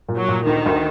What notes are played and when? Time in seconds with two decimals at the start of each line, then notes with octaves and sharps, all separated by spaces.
0.09 A#2
0.18 F#3
0.28 A#2
0.46 D2 D#3
0.66 D2